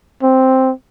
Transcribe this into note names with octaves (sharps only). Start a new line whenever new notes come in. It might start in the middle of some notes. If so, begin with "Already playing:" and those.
C4